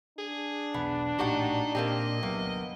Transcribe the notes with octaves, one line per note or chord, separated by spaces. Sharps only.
D4 G#4
B1 E2 B3
A#1 A2 D#4 F#4 G4 F#5
A#2 A#3 C4 G4 D#5
G1 C2 C3 F#3 A#3 B3